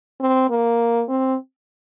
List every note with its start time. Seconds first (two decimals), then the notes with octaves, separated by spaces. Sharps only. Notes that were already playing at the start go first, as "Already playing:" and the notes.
0.20 C4
0.50 A#3
1.09 C4